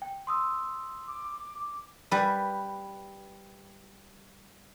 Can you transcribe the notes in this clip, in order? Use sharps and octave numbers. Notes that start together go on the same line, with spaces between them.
G5
C6 D#6 E6
D6
G3 B4